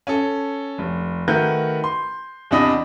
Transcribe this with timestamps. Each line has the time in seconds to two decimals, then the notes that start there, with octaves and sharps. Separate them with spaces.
0.07 C#4 A4
0.78 F1
1.28 D#3 A3 F#4 A#4 B4 G6
1.84 C6
2.51 E2 C3 D4 D#5 B5 D#6